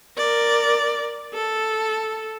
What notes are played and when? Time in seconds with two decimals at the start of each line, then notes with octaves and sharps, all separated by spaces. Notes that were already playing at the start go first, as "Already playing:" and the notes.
0.17 A#4 D5
1.33 A4